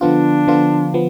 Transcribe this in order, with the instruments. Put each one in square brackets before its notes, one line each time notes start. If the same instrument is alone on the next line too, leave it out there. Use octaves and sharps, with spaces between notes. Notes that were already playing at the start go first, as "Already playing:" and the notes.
[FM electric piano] D3 F3 B3 F4 [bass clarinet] D4
[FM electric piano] D3 F3 B3 F4
F3 B3